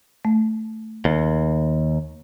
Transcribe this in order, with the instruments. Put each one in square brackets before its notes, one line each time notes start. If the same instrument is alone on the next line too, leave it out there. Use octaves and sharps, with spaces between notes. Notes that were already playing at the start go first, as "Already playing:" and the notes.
[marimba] A3
[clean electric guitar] D#2